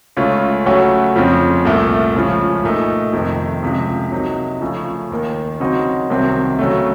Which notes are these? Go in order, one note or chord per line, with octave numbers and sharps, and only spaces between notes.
C#2 C#3 A3 C#4 F4
C#3 F#3 A3 C#4 F#4
F2 C#3 F3 C4
C2 A#2 A3
C#2 C#3 F3
A#2 A3 D#4
F2 C3 D#3
C#2 C3 F3
C3 F#3 A#3 D#4
C#3 F3 A3 C#4
D#2 D#3 A#3
C#3 F#3 C4 D#4 F#4
C2 C3 D#3 F#3 C4
C#3 F#3 A3